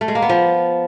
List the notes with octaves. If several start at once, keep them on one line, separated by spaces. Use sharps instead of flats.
A3
G#3
A#3
B3
F3